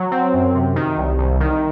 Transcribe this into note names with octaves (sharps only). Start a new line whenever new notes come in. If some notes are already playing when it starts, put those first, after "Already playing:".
Already playing: F#3
C4
F#2
C3
D#3
C2
C2
D#3